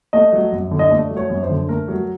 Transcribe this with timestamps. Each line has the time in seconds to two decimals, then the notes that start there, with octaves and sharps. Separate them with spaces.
0.13 A3 D#5
0.33 F#3
0.52 F#2
0.71 D3
0.79 D#5
0.91 A3 D5
1.10 F#3
1.17 C#5
1.30 F#2
1.43 C5
1.49 D3
1.68 A3 A#4
1.88 F#3